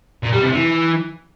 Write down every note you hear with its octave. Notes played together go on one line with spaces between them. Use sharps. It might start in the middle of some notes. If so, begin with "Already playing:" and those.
A#2
G3
C3
E3